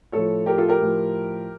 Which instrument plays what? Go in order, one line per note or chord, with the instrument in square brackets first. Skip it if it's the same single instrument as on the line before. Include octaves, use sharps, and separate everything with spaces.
[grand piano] A2 F3 A4 C#5
G4 A#4
F4 A4
G4 A#4
A2 F3